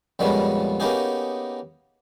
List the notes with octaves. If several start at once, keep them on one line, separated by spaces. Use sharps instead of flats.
F2 A#2 G3 G#3 B3 C#4
A#3 B3 C#4 D#4 G4 G#4